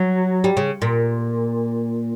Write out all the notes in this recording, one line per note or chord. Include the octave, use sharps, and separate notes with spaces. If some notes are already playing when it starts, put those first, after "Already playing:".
Already playing: F#3
G3
C#3
A#2